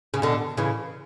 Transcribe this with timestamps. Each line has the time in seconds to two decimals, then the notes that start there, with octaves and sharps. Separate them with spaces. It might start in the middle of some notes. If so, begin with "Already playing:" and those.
0.14 C#3
0.22 B2 D3
0.57 C#3 E3